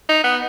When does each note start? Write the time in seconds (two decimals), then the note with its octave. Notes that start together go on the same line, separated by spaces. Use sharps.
0.09 D#4
0.24 B3